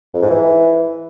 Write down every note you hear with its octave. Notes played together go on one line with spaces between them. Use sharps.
F2
G#2
E3